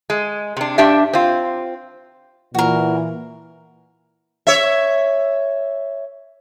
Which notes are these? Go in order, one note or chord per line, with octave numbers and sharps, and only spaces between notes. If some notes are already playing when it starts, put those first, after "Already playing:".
G#3
C3 D4
G2 D4 G4 E5
C4 F4
A#2 E3 F#4 A#4
C#5 E5